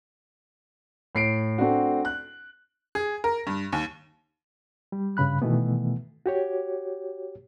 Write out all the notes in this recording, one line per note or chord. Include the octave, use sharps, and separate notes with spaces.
A2 C7 D7
A3 C4 D4 F#4
F#6
G#4
A#4
G2
D#2
G3
G2 C#3 B5 F#6
B2 D#3 E3 A3 B3
F#4 G4 C#5